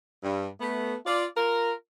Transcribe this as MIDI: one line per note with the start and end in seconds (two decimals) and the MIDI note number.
0.24 0.47 43
0.60 0.95 57
0.60 0.95 59
1.06 1.26 65
1.06 1.26 74
1.36 1.73 65
1.36 1.73 70